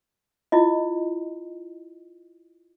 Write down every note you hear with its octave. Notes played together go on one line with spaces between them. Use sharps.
E4 F4 D#5